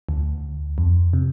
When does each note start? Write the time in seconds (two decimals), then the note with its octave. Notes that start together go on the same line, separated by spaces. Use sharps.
0.09 D2
0.78 F2
1.13 C3